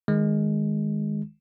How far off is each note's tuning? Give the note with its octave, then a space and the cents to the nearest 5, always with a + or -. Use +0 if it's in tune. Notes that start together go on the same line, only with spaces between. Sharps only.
D#3 +0 G#3 +0